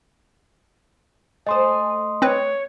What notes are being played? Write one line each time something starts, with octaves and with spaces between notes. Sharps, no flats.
A3 C5 D#5 G#5 C6 D#6
C4 B4 C#5